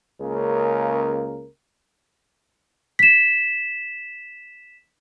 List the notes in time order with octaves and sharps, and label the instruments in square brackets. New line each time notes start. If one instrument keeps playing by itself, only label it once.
[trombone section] C#2 C#3 A#3 A#4
[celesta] B6 E7